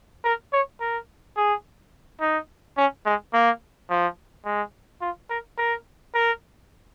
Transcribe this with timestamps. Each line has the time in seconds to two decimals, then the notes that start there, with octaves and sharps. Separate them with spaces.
0.24 A#4
0.53 C#5
0.81 A#4
1.37 G#4
2.21 D#4
2.77 C#4
3.06 G#3
3.33 A#3
3.90 F3
4.45 G#3
5.01 F4
5.30 A#4
5.58 A#4
6.15 A#4